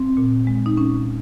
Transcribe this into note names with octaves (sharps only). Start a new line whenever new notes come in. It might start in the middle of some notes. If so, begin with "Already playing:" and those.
Already playing: C4
A#2
G#3
D#4
A#2 C#4